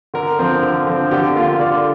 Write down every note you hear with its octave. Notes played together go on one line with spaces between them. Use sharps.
D3 A#4
F3 C4
D3
F3 C4
D3 G4
A#3 F4
D3 D5